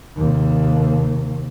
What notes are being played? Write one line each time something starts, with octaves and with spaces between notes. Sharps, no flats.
D#2 C3